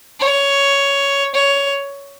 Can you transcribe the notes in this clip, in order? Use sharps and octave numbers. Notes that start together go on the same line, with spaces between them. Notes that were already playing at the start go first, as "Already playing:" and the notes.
C#5
C#5